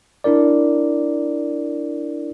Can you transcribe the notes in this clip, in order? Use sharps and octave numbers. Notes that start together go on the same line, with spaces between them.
D4 E4 A#4 D5